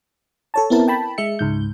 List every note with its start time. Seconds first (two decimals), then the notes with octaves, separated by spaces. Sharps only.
0.54 A4 C#5 A5
0.70 B3 C4 E4 A#4 A5
0.88 G5 A5 B5
1.18 G#3 E5 C#7
1.39 C#2 G#2 G6